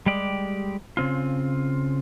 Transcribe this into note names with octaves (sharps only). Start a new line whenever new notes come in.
G3 G#3 G4 D5
C#3 C4 F4